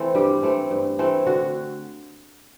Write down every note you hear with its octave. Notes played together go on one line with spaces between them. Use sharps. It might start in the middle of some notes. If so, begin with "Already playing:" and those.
Already playing: E3 A3 C4 A4
G2 G3 G4
E3 A3 C4
G2
E3 A3 C4
D3 F#4